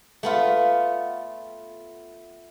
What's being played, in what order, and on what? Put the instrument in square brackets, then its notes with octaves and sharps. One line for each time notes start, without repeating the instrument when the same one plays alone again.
[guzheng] A3 B3 F4